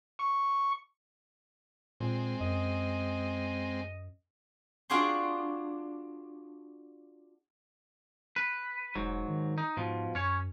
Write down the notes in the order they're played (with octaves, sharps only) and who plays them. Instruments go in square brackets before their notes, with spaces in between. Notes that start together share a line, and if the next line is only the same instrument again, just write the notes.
[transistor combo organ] C#6
[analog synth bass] A#2 [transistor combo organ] G#3 C4
[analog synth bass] F#2 [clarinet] D#5
[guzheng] D4 F4 F#4 G#4 G5 C6
[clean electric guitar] B4
[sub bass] E1 [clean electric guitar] G#2 F#3
[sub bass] D#3
[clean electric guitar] D#4
[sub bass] G#2 [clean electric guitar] B2 F3
[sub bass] F#2 [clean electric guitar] C#4 C#5